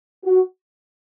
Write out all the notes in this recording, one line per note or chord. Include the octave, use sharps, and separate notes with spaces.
F#4